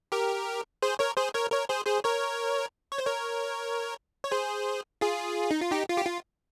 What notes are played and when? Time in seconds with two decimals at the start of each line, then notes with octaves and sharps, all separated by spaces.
0.12 G4 A#4
0.82 G#4 C5
0.99 A#4 C#5
1.17 G#4 C5
1.34 A#4 C#5
1.52 A#4 C#5
1.69 G#4 C5
1.87 G#4 C5
2.04 A#4 C#5
2.92 C#5
2.98 C5
3.06 A#4 C#5
4.24 C#5
4.31 G#4 C5
5.01 F4 G#4
5.51 D#4
5.61 F4
5.71 D#4 G4
5.89 F4
5.97 G4
6.06 F4